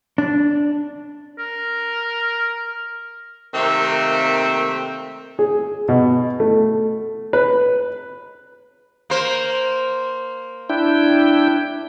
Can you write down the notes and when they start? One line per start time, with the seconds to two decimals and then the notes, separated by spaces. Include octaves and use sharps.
0.18 D4
1.39 A#4
3.54 C3 D#3 A3 A#3 C4
5.39 G#4
5.88 B2
6.40 A3
7.33 B4
9.10 A#3 C5
10.69 D4 E4 G5